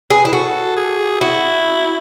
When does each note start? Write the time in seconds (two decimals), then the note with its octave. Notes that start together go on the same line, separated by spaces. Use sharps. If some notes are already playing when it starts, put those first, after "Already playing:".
0.10 G#4 B4
0.25 E4
0.33 F#4 A4
0.77 G#4
1.21 E4 F#4